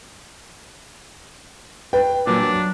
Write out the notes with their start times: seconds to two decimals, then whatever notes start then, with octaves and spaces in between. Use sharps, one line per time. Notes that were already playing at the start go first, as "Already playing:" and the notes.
1.93 B4 G5
2.27 A#2 F#3 D4
2.43 F#3